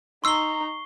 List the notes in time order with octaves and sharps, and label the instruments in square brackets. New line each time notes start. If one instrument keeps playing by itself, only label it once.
[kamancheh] D#4 A#5 [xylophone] C6 E6 [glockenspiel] C#6 C7 G7